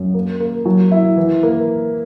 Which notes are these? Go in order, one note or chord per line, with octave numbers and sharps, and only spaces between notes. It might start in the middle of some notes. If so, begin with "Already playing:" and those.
Already playing: F#2
A#3
A#3
F#3
E4
E3
A#3